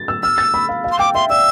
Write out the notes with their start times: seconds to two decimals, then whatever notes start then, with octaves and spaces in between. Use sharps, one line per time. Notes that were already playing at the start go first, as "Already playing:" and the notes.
Already playing: A6
0.08 E6
0.23 E6 F6
0.38 A6
0.54 B5
0.69 F5
0.84 F5
0.92 C6
0.99 G5 D6
1.15 E5 C6
1.30 D5 E6